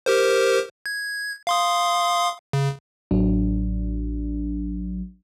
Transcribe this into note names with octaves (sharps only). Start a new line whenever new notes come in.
G4 A#4 C5
G#6
F5 C6 D#6
C#3
A1 F#3 D4